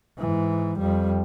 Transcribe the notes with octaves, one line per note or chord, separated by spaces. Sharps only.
G#2 E3
F2 G3